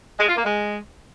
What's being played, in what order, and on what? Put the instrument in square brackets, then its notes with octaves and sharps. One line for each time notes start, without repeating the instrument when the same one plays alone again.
[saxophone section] G#3
F4
A#3
G#3